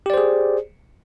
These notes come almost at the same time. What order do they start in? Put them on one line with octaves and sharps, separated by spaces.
G4 D5 C5 G#4